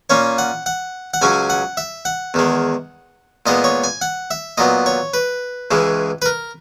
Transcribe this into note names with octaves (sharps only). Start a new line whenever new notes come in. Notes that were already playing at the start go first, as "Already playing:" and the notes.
A#2 A#3 C#4 C#5
F#5
F#5
F#5
C#2 C#3 F#3 C#4 G#5
F#5
E5
F#5
E2 D#3 G#3
A#2 G#3 B3 D#5
C#5
G#5
F#5
E5
A#2 F#3 B3 D#5
C#5
B4
C#2 C#3 E3 G#3
B4
A#4